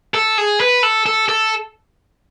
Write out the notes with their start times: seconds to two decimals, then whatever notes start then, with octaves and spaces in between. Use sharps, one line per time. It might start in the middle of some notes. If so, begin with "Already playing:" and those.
0.14 A4
0.38 G#4
0.60 B4
0.83 A4
1.06 A4
1.29 A4